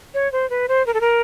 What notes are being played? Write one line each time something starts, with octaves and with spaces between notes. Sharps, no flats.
C#5
C5
B4
C5
A#4
A4
A#4